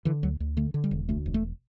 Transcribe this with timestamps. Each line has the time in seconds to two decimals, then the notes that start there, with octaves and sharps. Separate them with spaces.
0.05 D3 E3
0.23 D2 F#3
0.40 D2
0.57 D3 A3
0.74 D3
0.84 G3
0.91 E1
1.09 D2 A3
1.26 E1
1.34 A3